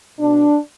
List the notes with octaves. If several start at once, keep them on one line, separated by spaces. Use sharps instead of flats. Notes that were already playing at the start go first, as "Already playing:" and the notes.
B2 D4